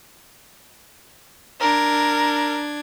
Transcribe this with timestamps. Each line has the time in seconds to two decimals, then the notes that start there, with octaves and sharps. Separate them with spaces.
1.61 D4 A#4 G#6